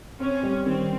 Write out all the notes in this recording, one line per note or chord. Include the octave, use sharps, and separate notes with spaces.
C4 C#4
G3
D#3 C4